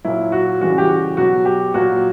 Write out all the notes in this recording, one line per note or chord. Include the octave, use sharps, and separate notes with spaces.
A#2 F#3 E4
F#4
C#3 E3 G3 F#4
G4
F#4
B2 F#3 F#4
G4
A#2 F#3 F#4